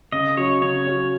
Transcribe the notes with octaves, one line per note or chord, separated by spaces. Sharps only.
C#3 D#5
F#3 C#4 C#5
C#3 C#5
F#3 C#4